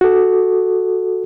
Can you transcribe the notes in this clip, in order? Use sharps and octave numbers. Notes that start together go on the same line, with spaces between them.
F#4 A4